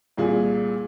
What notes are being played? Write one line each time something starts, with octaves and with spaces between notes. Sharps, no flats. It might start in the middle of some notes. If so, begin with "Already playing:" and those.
C2 A#2 G#4